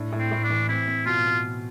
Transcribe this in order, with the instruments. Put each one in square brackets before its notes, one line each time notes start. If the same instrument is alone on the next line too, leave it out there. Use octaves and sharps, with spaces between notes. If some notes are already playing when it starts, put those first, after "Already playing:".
Already playing: [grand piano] A2 D4
A2
[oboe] C4
[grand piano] A2
[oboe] D4
[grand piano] E3
[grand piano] C4 [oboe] E4
[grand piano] C4
[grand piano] B2 [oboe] F4